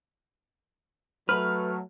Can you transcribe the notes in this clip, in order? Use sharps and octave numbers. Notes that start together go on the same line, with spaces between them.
F#3 A3 B4 F6